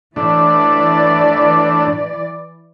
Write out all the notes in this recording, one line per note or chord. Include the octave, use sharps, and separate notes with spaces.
A2 E3 D4 D5